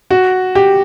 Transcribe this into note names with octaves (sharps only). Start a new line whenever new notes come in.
F#4
G4